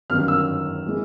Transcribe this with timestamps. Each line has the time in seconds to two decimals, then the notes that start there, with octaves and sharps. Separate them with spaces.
0.10 G1 F#2 D#3 F6
0.28 E6
0.87 E3 G#3